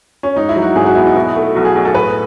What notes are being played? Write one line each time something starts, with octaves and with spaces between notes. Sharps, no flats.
C#4
G#2 D#4
E4
F#3
F#4
G#1 G#4
F#4
B3 E4
D#4
B2 E4
A3
B1 F#4
G#4
B1
A4
A2 B4